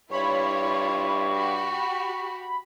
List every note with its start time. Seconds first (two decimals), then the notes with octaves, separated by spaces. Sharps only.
0.12 G2 E4 F4 C#5 B5 C#6
1.33 F#4 G4